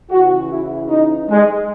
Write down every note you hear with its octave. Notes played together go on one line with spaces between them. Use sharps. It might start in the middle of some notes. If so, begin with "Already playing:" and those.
C#3 E3 F#4
E4
D#4
G#3